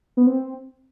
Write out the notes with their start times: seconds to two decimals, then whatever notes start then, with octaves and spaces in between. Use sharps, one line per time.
0.17 B3
0.27 C4